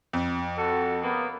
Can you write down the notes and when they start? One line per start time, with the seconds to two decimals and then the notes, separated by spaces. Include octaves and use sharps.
0.13 F2
0.57 F#4 A4
1.02 C#3 A#3 B3